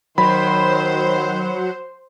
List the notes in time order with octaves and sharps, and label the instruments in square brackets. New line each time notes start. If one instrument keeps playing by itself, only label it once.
[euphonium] D#3 [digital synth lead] F#3 [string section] C5 [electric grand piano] B5